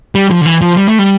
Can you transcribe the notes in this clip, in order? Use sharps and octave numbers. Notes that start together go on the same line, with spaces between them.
G3
F3
D3
E3
F3
G3
A3
G3